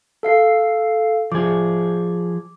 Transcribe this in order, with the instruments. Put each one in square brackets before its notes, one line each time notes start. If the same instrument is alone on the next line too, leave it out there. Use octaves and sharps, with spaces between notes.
[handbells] A4 F5 C7
[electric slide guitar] F3 G#4 [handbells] D6